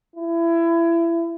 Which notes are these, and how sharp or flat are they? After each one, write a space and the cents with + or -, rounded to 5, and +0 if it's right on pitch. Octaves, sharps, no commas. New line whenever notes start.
E4 +25